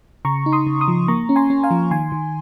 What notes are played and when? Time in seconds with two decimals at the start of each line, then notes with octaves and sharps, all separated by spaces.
0.25 C#3 A#5 C#6
0.46 D#4
0.52 C6 D#6
0.67 C#3
0.81 C6 D#6
0.88 F3
1.08 A#3 A#5 C#6
1.29 C#4
1.36 G#5 C6
1.50 C#4
1.63 F5 G#5
1.71 F3
1.91 D#3 G#5 C6
2.12 D#3